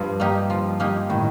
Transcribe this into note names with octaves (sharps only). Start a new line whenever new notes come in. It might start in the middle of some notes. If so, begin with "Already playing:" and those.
Already playing: G2 F3
A#3 D#4 G4
F3
A#3 D#4 G4
A2 D#3